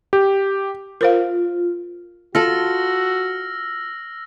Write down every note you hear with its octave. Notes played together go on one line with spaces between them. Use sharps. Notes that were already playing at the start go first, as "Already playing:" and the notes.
G4
F4 A#4 C5 F5
F4 F#4 A4 E6 F6 A#6